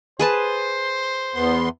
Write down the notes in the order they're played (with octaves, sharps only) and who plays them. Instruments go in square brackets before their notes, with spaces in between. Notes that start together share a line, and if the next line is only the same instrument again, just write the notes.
[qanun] G#4 B4 A5 [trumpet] C5
[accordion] E2 B3 C6